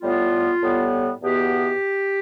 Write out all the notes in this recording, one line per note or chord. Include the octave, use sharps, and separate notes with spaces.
A2 G3 B3 F4
A2 G3 B3
E2 B2 B3 G4